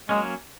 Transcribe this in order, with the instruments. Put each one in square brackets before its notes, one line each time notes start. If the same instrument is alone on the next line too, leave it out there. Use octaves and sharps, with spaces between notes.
[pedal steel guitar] F#3 A#3 C#4 [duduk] G#3